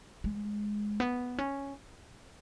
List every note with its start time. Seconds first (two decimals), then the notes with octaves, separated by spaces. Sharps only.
0.24 G#3
1.00 B3
1.38 C#4